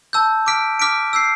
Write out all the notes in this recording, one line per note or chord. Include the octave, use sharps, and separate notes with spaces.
A5 E6 G6
D6 F6 B6 D7
D6 F6 B6 D7
E6 G6 C7